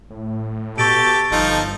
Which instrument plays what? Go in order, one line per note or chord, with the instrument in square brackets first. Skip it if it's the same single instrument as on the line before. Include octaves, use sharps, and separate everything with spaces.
[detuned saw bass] A2
[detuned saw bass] B2 [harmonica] G4 A4 [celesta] C#6 A6 D7
[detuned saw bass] G1 [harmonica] F3 D#4 A4